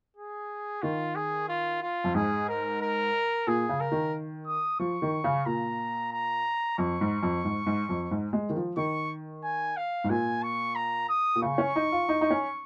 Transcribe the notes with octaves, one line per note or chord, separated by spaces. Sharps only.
G#4
D#3 F4
G#4
F4
F4
F2
G#2 G#4
A#4
A#4
A#2 G#4
C#3
A#4
D#3
D#6
F3 C#6
D#3
C#3
A#2 A#5
A#5
F2 C#6
G#2
F2
G#2
G#2
F2
G#2
G#3
D#3
F3
D#3 C#6
G#5
F5
G#2
A#2 G#5
C#6
A#5
D#6
A#2
C#3 C#6
C#4
D#4
F4
D#4
D#4
C#4